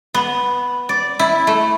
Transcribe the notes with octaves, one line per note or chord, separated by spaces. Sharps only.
B3
D5
E4
A3